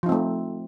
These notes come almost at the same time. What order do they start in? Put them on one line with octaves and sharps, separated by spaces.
F3 D#4 C4 A3